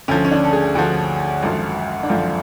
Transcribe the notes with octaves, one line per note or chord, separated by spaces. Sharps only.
D2 D3 F3 C#4
C#4
D4
A4
G#4
D2 D3 F3 F#4
G#1 F#2 D3 F3 F#4
D4
G#1 F#2 D3 F3 F4